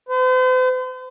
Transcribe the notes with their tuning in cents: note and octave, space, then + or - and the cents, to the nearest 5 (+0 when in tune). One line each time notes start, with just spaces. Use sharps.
C5 -45